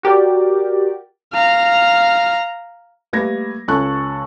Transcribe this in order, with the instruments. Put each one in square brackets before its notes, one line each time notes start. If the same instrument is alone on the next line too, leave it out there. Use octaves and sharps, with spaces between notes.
[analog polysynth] F#4 G4 A#4 D5
[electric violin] F5 A#5
[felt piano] G3 A3 A#3 B4 G#6 A#6
C#2 C#4 A4 A5 C#6 F#6